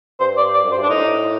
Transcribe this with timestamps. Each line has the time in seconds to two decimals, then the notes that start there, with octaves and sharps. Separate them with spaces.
0.20 G2 C5
0.38 D5
0.54 D5
0.64 F#2
0.72 C5
0.77 G2
0.83 D4
0.89 A2 D#4